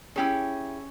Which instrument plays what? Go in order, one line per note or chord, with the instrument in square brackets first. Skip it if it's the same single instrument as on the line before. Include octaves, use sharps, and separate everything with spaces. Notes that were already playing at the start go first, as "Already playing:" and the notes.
[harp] C#4 C#5 [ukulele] E4 G4 G#4